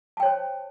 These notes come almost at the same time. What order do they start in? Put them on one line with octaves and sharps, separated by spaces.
A5 G5 C#5 C5